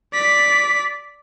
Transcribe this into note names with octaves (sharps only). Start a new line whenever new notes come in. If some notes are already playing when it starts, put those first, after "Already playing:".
D5 B6